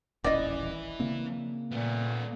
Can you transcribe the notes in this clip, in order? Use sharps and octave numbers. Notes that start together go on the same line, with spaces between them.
D#1 A1 E3 C#4 D5 D#5
C#3 A#3 C4
A#2 A3 B3